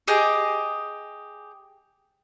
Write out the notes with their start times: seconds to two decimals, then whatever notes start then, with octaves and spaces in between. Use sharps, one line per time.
0.07 G4 G#4 D#5 G5